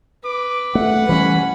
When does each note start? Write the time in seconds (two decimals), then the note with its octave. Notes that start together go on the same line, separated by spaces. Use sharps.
0.25 B4 D6
0.75 A3 F#5
1.09 E3 F3 G3 C#4 B5